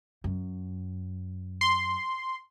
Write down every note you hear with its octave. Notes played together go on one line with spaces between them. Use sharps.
F#2
C6